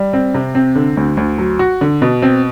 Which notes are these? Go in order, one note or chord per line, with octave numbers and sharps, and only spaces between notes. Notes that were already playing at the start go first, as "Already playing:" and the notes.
Already playing: G3
C4
C3
C4
D3
D2
D2
F#3
F#4
D3
B2
C4